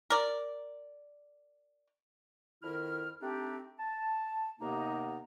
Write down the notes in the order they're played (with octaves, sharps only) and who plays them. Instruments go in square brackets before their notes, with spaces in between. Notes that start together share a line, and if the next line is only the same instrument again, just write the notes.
[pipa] A#4 D5
[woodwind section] F2 D#3 E4 F6
A3 C4 D4 D#4 G4
A5
D#2 C3 A#3 B3 D#4 A#5